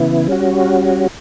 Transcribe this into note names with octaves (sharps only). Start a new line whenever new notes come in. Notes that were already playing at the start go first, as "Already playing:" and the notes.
Already playing: C#3 E3 B3 E4
G3 C#4 F#4